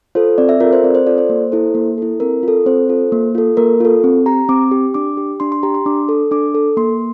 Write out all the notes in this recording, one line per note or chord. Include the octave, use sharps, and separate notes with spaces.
F4 A4 C5
C4 D5
E5
F4 A4 A#4
C5
C4 D5
C5
F4 A4 D5
C5
A#3
E4 A4
A#3
E4 A4
C4 A#4
F4 A4
C4 C5
F4 A4
A#3
F4 A4
A#3 A#4
F4 A4
C4
G4 A#5
C4 D6
G4
D4 D6
G4
D4 C6
C6
G4 A#5
C6
D4 D6
A4
D4 D6
A4
A#3 C6